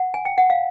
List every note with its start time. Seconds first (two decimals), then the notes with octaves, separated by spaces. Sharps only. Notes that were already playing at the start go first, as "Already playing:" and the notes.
Already playing: F#5
0.14 G#5
0.25 G5
0.38 F#5
0.50 F5